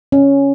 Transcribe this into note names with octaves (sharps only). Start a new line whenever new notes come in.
C#4